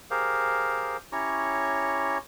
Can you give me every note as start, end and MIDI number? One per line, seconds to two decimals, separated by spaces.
0.11 0.97 67
0.11 0.97 68
0.11 0.97 70
0.11 0.97 72
0.11 0.97 77
1.12 2.18 61
1.12 2.18 64
1.12 2.18 67
1.12 2.18 73
1.12 2.18 82
1.12 2.18 85